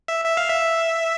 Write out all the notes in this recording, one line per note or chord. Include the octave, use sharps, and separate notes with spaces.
E5
E5
F5
E5